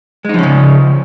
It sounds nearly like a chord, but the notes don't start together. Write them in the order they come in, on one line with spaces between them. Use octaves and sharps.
G#3 D#4 F3 C#4 C#3